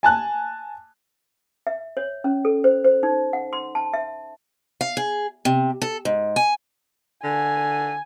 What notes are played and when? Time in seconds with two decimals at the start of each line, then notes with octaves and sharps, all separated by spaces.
0.03 G#5 A5 F#6
1.67 E5
1.97 C#5
2.24 C#4
2.45 A4
2.64 C5
2.84 C5
3.03 D#4
3.33 F#5
3.53 C6
3.75 A5
3.94 E5
4.81 F5
4.97 G#4
5.45 C3
5.82 A4
6.05 G#2
6.36 G#5
7.24 D3 G#5